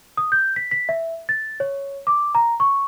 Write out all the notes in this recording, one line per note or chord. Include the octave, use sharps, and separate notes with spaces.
D#6
G6
B6
B6
E5
A6
C#5
D6
A#5
C#6